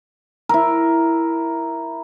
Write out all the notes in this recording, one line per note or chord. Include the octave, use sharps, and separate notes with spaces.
E4 A#4